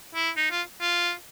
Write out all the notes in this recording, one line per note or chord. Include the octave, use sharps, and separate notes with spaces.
E4
D#4
F4
F4